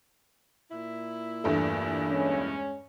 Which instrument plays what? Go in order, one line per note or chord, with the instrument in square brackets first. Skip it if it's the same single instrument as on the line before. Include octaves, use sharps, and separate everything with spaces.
[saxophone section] A#2 E4
[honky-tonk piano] E2 G2 A3
[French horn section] G#3 C#4